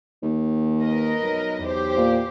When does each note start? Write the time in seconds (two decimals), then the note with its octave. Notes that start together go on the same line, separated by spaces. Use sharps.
0.22 D#2
0.82 A#4 B4 D#5
1.23 B1
1.61 E2 G4 C5
1.97 A#2